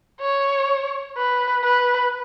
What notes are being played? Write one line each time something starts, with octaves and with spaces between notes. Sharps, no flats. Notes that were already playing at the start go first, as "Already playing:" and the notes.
C#5
B4
B4